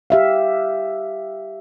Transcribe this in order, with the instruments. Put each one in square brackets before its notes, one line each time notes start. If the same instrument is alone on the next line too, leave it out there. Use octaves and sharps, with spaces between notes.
[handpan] G4 E5 F5